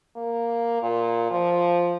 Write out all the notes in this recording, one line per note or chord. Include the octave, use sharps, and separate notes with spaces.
A#3
A#2
F3